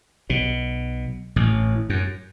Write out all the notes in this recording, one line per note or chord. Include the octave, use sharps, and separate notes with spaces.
B1 B2
A1 A2
F#2